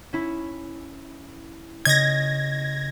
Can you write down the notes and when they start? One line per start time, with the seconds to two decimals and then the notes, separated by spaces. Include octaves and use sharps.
0.13 C#4 E4
1.85 C#3 D#5 G#6 A#6